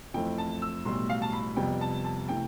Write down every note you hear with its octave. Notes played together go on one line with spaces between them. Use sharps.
F2 E3 A3 C4 G5
A5
E6
B1 A2 E3 G3 C6
F5
A5
B5
F2 C3 G3 B3 G5
A5
A5
C3 E3 A3 G5